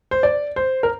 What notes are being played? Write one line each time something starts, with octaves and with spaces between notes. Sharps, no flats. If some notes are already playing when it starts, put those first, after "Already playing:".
C5
D5
C5
A#4